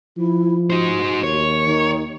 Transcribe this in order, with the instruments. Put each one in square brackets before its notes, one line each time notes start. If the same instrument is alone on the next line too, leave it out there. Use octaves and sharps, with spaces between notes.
[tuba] F3 [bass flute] E4
[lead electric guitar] D#4 C5 [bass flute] F#4
[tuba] D#2 [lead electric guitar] C#5
[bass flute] D#3